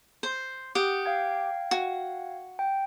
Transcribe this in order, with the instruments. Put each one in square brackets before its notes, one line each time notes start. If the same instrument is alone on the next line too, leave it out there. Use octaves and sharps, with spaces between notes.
[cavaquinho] C5
[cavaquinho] G4 F#5 [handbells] D#6
[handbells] F5 G5 G#6
[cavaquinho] F#4
[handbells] G5